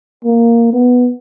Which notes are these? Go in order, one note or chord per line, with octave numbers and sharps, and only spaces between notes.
A#3
B3